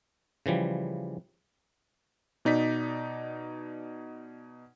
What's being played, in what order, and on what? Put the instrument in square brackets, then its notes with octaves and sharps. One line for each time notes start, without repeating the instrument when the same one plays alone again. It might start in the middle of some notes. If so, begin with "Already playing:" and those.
[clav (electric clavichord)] C#3 E3 F3 G3
[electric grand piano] B2 D#4 D5 B6